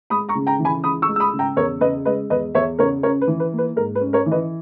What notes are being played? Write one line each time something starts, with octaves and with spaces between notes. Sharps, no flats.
G#3 B5 D#6
A#5 C#6
C#3
G5 A#5
E3
G#5 B5
C#2 B5 D#6
C#6 E6
G#3
E6
B5 D#6
C#3
G5 A#5
E2 A#4 C#5
C#3 B4 D#5
G#3 B4 D#5
E2 B4 D#5
E2 C#5 E5
C#3 A#4 C#5
C#4 A#4 C#5
B4
E3
B4
A#3
B4
G#2 A#4
B4
C#4
A#4 C#5
E3
B4 D#5